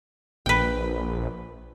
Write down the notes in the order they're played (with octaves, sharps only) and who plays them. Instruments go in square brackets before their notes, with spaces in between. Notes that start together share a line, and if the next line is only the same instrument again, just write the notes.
[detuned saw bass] A#1 [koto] B4 G5